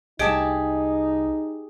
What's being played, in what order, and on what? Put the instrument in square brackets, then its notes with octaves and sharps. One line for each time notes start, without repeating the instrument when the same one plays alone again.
[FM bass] C2 [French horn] D#4 [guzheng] G4 G#4 A5 [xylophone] D#5 D7